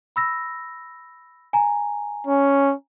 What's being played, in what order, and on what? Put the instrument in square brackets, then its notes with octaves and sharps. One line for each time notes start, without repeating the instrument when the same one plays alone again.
[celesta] B5 E6 A#6
G#5 A#5
[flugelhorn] C#4